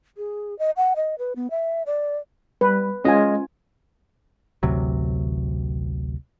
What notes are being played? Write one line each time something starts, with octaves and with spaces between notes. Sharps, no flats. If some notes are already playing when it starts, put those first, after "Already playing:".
G#4
D#5
F#5
D#5
B4
B3
E5
D5
G3 B4
G#3 C#4 F4 D#5 G#5
A1 D2 C3 F#3